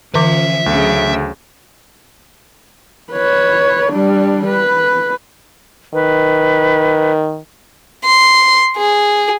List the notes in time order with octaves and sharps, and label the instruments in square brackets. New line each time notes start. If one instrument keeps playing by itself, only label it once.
[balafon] D3 E3 D6 [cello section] F3 C#4 [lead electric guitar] E5
[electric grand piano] D2 [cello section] C#3 F#3 A3
[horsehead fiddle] B4 C#5
G3 D4
B4
[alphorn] D#3 [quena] B4
[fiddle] C6
G#4